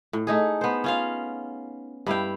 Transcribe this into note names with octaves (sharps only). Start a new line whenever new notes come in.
A2
A3 D#4 G#4
B3 C5
C#4 F4 F5
G2 E4 F5 G5